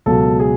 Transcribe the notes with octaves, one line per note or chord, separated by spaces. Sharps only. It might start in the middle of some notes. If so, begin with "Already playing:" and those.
C#2 B2 F#3 A4
G#4